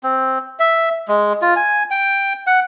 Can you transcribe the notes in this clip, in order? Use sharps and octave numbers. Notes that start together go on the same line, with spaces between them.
C4
E5
G#3
F4
G#5
G5
F#5